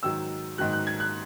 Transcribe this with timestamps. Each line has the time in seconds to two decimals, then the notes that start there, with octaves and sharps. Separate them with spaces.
0.03 G#2 D#3 F#3 E6
0.58 G#2 D#3 F#3 F#6
0.73 F#6
0.87 G#6
1.00 F#6